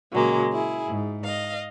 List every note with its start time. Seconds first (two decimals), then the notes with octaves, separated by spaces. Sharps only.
0.12 A#2 C#3 F#3 G#3 A#3
0.51 E4 G#4
0.87 G#2
1.24 D#5 F5